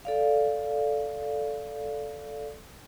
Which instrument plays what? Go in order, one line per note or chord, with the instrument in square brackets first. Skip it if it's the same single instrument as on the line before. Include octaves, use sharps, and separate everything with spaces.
[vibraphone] A4 D5 F5